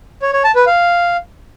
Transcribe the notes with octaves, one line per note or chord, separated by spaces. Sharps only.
C#5
C#5
A5
B4
F5